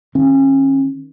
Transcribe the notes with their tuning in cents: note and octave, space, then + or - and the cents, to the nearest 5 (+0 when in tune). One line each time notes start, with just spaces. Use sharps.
D#3 +0 C#4 -35